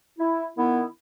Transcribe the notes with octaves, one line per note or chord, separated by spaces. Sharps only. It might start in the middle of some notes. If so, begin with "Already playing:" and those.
E4
D#3 B3 E4